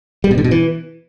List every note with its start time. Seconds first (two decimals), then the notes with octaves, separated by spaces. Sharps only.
0.24 G3
0.31 B2
0.38 D3
0.44 B2
0.51 E3